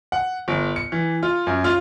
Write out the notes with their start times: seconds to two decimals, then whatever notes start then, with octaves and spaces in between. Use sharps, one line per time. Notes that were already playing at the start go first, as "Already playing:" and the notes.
0.12 F#5
0.48 G1
0.76 C#7
0.92 E3
1.23 F4
1.47 F#2
1.64 F4